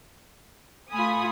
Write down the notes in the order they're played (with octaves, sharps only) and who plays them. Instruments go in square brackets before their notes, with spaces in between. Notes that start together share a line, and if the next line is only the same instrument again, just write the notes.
[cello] A3 F4 [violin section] G#5 B5 D#6